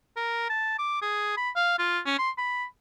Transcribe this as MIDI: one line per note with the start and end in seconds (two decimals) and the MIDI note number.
0.16 0.45 70
0.49 0.74 81
0.79 0.98 86
1.02 1.33 68
1.37 1.50 83
1.56 1.74 77
1.79 1.99 65
2.06 2.18 61
2.18 2.30 84
2.38 2.65 83